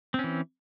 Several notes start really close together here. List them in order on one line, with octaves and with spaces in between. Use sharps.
C4 C#4 E3